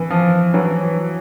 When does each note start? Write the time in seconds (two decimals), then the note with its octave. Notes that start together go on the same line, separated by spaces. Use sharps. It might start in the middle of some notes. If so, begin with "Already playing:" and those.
Already playing: E3
0.10 F3
0.54 E3 F#3